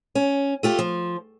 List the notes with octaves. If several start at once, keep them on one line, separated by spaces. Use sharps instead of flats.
C#4
A3 F4 G4
F3